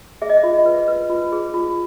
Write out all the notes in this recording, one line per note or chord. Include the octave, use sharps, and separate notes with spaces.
G#4 E5
D#5
E5
F4
B4
B4
F4
G#4
F4